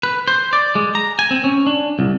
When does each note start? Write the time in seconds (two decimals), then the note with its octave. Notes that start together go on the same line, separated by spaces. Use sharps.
0.03 B4
0.28 C5
0.53 D5
0.75 G#3
0.95 A#5
1.19 G#5
1.31 C4
1.44 C#4
1.67 D4
1.99 C2